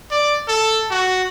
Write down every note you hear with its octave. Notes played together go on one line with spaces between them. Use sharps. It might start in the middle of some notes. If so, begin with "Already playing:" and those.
D5
A4
F#4